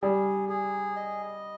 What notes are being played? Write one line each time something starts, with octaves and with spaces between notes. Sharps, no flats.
G3 G#4
G#4
D#5